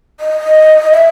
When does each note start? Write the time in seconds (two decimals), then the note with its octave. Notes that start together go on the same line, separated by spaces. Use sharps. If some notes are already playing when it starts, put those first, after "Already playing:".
0.20 D#5
0.92 E5